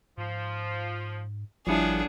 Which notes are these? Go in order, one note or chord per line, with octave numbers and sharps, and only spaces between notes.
G#2 F3
G#1 C#3 F3 G3 B3 D4 E4 G#4